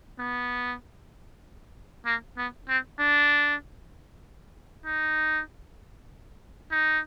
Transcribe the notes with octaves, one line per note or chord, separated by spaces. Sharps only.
B3
A#3
B3
C4
D4
D#4
D#4